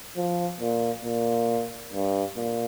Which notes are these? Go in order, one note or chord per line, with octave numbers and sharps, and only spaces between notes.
F3
A#2
A#2
G2
A#2